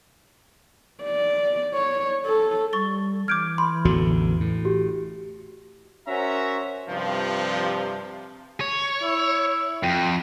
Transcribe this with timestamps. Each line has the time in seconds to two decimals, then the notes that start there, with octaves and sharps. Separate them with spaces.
1.04 D5
1.74 C#5
2.26 A4
2.73 G3 C#6 A6 G7
3.28 E3 D6 F6 G6 G#6 D7
3.58 B5 C6
3.85 A1 E2 D3 F#4
4.41 A2
4.65 F#4 G4
6.08 C#4 F#4 A#4 C5 E5 A#5
6.89 G2 C3 F3
8.61 C#5
9.03 E4
9.83 F2 G5